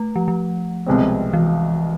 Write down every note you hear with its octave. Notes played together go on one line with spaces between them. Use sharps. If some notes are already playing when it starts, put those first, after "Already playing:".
Already playing: A3
F3
F3
C2 B2 G#3 C4
E3